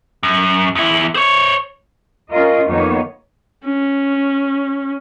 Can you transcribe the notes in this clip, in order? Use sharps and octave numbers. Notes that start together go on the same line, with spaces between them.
F#2
E2 E4
C5 C#5
C#4 F4 A#4 D#5
F2 D#3 A#3 B3 D#4 C#5
C#4